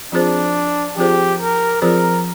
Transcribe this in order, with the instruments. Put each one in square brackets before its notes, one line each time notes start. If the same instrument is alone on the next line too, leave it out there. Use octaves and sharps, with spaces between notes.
[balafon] F3 C4 F4 G#4 C5 [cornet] D4
[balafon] F3 C4 F4 G#4 C5 [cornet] G4
[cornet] A#4
[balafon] F3 C4 F4 G#4 C5 [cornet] A#4